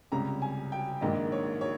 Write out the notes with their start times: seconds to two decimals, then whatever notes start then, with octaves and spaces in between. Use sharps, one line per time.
0.12 C#2 C3 G3 C#4 A#5
0.42 G#5
0.72 G5
1.01 A#1 G#2 D#3 A#3 D#5
1.32 C#5
1.61 C#5